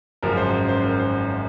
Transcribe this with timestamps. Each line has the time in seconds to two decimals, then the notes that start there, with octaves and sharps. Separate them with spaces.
0.22 G#1 F#2 C#3 F3 A#4
0.37 C5
0.69 C5
0.80 C5
0.83 A#4
0.99 C5
1.22 C#5
1.29 C5